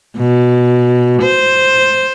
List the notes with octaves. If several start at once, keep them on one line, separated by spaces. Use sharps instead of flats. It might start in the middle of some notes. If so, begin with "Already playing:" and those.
B2
C5